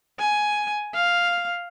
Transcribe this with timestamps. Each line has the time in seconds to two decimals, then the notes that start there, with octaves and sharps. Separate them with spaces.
0.19 G#5
0.95 F5